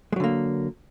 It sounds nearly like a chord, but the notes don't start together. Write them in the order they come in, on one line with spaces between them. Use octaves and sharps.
G#3 F#3 D3 A#3